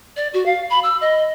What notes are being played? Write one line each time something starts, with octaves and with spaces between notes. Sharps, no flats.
D5
F#4
F5
B5
E6
D#5